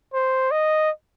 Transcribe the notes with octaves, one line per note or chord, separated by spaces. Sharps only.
C5
D#5